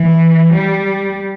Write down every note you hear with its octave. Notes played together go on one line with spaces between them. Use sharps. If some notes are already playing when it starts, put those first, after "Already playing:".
Already playing: E3
G3